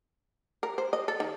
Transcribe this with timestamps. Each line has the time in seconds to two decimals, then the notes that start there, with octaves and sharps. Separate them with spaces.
0.63 A#4
0.78 C5
0.93 D#5
1.08 A4
1.20 D#3